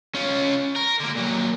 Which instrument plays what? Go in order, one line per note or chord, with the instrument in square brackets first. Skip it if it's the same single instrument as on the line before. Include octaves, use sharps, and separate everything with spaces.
[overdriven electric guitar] C#4 F4
A#4
D3 A#3
A#2 F#3